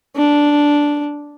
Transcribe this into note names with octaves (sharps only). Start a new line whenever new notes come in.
D4